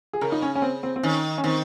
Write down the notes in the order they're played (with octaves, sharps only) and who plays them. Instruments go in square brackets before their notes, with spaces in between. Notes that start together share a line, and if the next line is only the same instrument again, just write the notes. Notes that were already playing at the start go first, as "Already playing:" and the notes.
[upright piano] G#4
[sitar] C#3 [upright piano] A#4
[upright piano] D#4
C#4
C#4
C4
C4
C4
[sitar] D#3 [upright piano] C#4
[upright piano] C#4
[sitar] D#3 [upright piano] C4